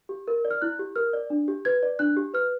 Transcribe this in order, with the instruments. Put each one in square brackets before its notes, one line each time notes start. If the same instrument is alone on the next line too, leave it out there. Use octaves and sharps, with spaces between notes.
[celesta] G4
A#4
D5
F6
E4 F#6
G4
A#4 F6
D5
D4
G4
B4 G#6
D5
D4 F#6
G4
B4 F6